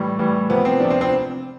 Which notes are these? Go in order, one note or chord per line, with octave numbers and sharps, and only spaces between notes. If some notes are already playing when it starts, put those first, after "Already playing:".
Already playing: A2 E3 G3
A2 E3 G3
C3 F3 B3
C4
C3 F3 D4
C4
C4